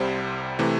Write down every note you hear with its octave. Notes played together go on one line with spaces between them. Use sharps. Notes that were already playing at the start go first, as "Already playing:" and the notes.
Already playing: C2 C3 G3 C5
C3 E3 A3